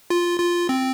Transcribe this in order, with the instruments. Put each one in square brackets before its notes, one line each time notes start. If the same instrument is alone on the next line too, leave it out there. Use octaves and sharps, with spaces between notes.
[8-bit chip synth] F4
F4
C4